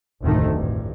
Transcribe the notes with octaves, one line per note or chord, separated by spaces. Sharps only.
F1 D2 A2 C3 D#3 A3
A1 G2